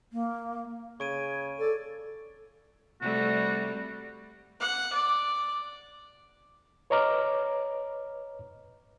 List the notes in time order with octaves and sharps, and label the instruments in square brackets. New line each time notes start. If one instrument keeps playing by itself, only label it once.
[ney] A#3
[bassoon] C#3 [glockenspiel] C#6 D7 D#7 [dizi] G#6
[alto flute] A4 [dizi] D5
[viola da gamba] C3 G3 A3 [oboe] F#4
[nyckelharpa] F#5
D5
[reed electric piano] B4 C#5 D#5 A#5 D6 F6